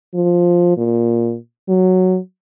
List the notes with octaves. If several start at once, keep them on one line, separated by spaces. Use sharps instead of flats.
F3
A#2
F#3